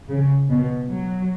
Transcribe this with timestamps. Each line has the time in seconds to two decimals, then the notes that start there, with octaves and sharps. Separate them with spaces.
0.09 C#3
0.50 B2
0.90 F#3